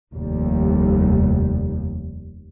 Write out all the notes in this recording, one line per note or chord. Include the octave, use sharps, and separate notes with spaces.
F1 D#2 G3